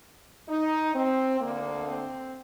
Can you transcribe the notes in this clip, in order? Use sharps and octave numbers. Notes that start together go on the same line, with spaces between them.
D#4
C4
D2 D3 A#3
C4